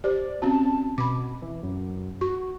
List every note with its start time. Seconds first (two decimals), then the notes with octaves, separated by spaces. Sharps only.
0.04 G4 C5 D5
0.42 C4 C#4 F#4 A5
0.98 B2 B5 D6
1.42 E3
1.63 F#2
2.21 F#4 C#6